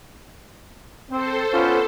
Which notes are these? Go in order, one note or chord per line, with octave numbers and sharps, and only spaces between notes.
C4 A4 C5
B3 C#4 F4